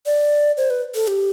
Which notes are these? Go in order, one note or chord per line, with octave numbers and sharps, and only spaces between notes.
D5
C5
B4
A4
G4